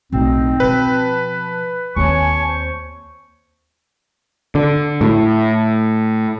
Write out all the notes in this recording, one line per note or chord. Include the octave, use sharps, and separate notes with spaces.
B1 A2 C4 D#4
B2 F3 B4 A5
D#2 C4 C#5 G#5 A5 C#6
C5
D3
A2